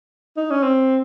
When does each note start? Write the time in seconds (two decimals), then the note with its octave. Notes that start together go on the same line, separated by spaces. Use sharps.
0.37 D#4
0.51 C#4
0.63 C4